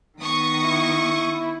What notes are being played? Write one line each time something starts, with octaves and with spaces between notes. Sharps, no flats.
D#3 B3 C#6 D#6
E4